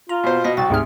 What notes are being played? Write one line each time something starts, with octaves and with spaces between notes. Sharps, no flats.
F4 A#5
B2 B3 C5
B2 D#5 A#6
C2 F#4 G5 A6
D2 G#2 C3 G#4 F6